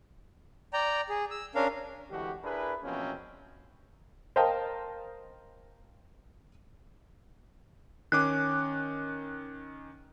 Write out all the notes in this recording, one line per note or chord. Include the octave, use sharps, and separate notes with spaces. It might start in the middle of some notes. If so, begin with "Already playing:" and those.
D5 G5 A#5
G#4
E6
C#4 D4 A#4 F5
C2 D3 E3 G#3 F#4 G4
D4 E4 G#4 A#4 B4
B2 E3 F3 A#3 C4 C#4
A#4 C5 D#5 F5 G5 A5
D#3 C#4 D6 F#6